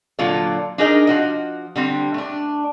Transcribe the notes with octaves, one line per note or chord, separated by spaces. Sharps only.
A#2 D3 F#3 F4 A4 D5
D4 D#4 G#4 A#4 D5 D#5
F3 F#4 D#5
D3 G3 C4
A3 D4